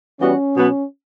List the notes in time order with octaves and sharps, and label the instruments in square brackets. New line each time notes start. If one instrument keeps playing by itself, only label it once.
[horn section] E3 G3 B3 F#4 [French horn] C#4
[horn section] B2 F#3 B3